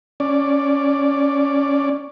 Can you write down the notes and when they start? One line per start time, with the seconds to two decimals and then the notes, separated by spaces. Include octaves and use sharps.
0.20 C#4 D5